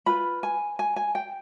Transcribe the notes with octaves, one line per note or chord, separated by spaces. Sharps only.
F4 B4 B5
G#5
G#5
G#5
G5